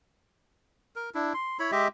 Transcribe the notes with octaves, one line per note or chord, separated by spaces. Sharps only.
A#4
D4 E4
C6
E4 C#5 B5
G#3 G4 D#5 E5